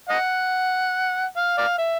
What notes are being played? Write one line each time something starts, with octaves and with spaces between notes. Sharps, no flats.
D#5 F#5
F5
D5 F5
E5